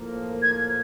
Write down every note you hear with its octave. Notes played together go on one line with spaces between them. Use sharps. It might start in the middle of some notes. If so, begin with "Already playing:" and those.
Already playing: A2 F3 A#3
G#6